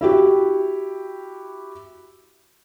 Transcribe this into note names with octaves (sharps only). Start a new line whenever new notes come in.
E4 F#4 G4